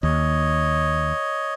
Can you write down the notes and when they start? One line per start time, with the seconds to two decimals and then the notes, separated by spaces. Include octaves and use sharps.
0.03 D#2 C#5 D#5